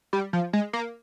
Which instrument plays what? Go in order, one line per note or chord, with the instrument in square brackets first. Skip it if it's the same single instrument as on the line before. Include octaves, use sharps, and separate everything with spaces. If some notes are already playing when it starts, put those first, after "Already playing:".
[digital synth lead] G3
F3
G#3
A#3